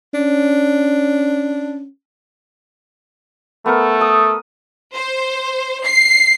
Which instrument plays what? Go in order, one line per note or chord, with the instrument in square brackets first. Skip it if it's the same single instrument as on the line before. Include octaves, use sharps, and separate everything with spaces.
[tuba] C#4 [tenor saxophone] D4
[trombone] A3 [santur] B3 A#4
[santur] D#6
[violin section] C5
C7